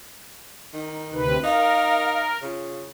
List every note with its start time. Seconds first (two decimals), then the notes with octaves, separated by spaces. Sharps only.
0.74 D#3 D#4
1.13 D2 C3 B4
1.44 D#4 A#4 F5
2.42 C#3 F4